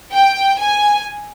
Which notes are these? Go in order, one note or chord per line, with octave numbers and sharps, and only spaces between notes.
G5
G#5